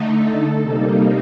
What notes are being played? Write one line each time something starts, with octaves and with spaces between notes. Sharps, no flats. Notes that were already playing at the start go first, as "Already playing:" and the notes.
Already playing: D3 A3 D#4
A4
C3 G3 A#3 D#4